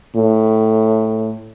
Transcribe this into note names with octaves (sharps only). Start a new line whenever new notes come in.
A2